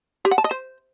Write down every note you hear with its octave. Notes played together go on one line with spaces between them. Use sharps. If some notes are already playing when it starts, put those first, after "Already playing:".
G4
F#5
A5
D#5
C5